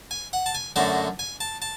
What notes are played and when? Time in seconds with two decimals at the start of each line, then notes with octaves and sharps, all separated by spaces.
0.11 G#5
0.33 F#5
0.46 A5
0.55 G#5
0.76 F#2 D3 F#3 A3 A5
1.19 G#5
1.40 A5
1.62 A5